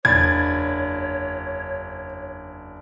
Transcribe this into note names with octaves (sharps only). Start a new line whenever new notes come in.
F#1 E2 D4 C#5 B5 G#6 A6